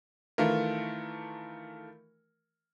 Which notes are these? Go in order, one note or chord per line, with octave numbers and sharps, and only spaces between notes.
D#3 E3 A3 F4 A#4